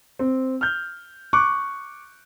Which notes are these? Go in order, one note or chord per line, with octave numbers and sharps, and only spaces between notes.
C4
F6 G6
C#6 D6 F#6